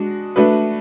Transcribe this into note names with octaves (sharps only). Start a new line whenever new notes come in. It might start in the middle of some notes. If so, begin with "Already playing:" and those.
Already playing: G#3 D4 F#4
A3 D4 F#4 B4